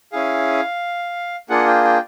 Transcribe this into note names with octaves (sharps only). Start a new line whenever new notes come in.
C#4 E4 G#4 F5
A#3 D4 F4 G#4 F#5
G5
G5